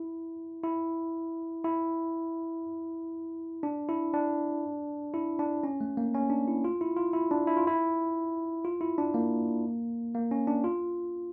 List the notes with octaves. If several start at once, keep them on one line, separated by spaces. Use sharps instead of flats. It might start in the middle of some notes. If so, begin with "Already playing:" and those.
Already playing: E4
E4
E4
D4
E4
D4
E4
D4
C#4
A3
A#3
C#4
D4
E4
F4
E4
F4
E4
D4
E4
F4
E4
F4
E4
D4
A#3
A#3
C#4
D4
F4